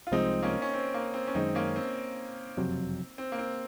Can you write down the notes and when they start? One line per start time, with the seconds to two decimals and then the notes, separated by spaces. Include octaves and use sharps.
0.07 F4
0.12 C2 C3 F3 G#3 C4 D#4
0.42 A#3 C#4
0.62 C#4
0.74 C4
0.94 A#3
1.14 C4
1.27 C#4
1.35 F#2 D#3 G#3 C4 D#4
1.55 A#3 C#4
1.76 C4
2.57 F#1 F2 C3 F#3
3.18 C4
3.32 A#3
3.39 C4